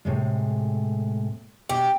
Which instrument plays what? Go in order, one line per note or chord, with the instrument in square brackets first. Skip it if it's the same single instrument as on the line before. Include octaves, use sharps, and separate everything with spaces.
[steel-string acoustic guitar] A2 C3 G#3
[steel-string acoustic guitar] B2 [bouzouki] G4